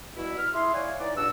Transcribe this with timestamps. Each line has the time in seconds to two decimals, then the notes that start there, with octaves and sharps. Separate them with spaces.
0.17 B2 G3 E4
0.38 F6
0.54 E4 G#4 C6
0.74 C#5 D5 F5 F#5 G#5
1.00 E3 D#4 D5
1.17 C#2 G2 A#2 D4 F#4 E6